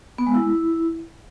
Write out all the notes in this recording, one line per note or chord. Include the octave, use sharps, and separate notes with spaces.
B3
G#3
E4